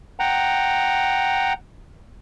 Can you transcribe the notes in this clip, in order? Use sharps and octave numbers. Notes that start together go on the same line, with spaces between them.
F#5 G5 A#5